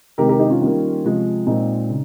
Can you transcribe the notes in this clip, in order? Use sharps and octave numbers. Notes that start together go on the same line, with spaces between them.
C3 D#3 G#3 C4 G4 A#4
G4 A#4
D#4 G4
C#4 F4
D#3 G3 A#3
C3 F3 G#3
A#2 G#3 C4 D#4
C#3